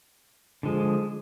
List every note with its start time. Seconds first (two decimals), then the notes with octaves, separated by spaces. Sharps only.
0.63 D3 F3 G#3